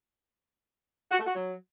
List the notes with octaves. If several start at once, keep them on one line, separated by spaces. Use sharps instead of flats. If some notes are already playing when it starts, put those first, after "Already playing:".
F#4
A3
F#4
F#3